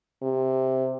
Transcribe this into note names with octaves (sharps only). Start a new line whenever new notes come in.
C3